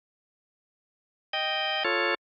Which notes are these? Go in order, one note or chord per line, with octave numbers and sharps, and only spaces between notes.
D#5 G5
F4 A4 C#5